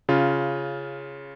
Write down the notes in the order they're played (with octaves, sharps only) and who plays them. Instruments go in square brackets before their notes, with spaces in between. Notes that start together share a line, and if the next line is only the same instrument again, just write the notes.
[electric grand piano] C#3 F4